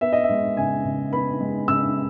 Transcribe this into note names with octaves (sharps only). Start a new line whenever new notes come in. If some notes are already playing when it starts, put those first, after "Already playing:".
B3 E5
D#5
E5
G#3
C#3 G#5
C#3
B3 B5
G#3
C#3 E6